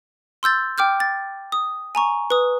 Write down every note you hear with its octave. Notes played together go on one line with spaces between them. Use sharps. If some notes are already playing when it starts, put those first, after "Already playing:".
C6 E6 G6 A6
G5 D6 F6 G6
A6
D#6
G#5 A#5 C#6
B4 D#6